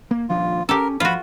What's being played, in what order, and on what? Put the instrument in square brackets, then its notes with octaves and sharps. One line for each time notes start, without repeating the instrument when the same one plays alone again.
[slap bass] A#3
[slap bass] D#1 F3 D4 [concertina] F4
[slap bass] C#4 [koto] G4 A4 [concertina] A#4
[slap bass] G2 F3 [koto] F4 F#4 [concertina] B5